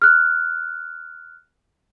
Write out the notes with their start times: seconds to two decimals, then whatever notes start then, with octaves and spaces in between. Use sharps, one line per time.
0.02 F6 F#6